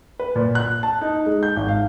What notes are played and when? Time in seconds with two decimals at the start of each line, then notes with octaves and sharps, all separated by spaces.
0.20 B4
0.36 A#2
0.55 F#6
0.83 A5
1.01 D#4
1.26 G#3
1.43 G6
1.57 G#1
1.68 F5